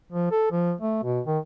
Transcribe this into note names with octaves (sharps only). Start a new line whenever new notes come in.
F3
A4
F3
A3
B2
D#3